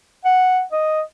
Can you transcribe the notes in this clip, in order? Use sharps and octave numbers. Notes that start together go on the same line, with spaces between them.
F#5
D#5